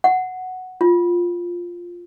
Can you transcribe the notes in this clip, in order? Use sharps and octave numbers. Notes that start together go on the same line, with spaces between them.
F#5
F4